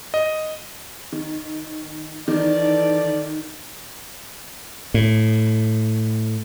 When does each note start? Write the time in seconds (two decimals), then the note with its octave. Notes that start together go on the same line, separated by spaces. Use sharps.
0.14 D#5
1.12 D#3
2.28 D#3 E3 A4 D5
4.94 A2